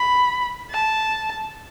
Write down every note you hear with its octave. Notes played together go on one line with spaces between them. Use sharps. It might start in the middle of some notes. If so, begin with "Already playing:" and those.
Already playing: B5
A5